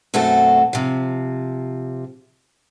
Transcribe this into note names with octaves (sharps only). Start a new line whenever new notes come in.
F#2 B2 A3 C4 F#4 A4
C3 F3